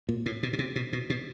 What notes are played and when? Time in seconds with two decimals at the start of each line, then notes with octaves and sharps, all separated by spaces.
0.09 A#2
0.26 A2
0.43 B2
0.53 B2
0.59 C3
0.76 B2
0.93 B2
1.10 B2